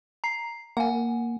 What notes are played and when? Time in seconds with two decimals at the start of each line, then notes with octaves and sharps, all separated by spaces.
0.24 A#5 C7
0.77 A#3 F#5 G#5